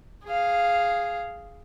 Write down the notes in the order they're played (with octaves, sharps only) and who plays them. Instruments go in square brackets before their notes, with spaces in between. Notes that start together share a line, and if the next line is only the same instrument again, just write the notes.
[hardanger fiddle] G#4 F5